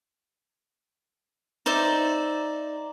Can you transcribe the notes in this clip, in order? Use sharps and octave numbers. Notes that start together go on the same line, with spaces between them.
D#4 C5 D5 E5